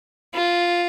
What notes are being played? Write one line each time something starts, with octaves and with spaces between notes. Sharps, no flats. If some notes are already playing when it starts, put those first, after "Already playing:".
F4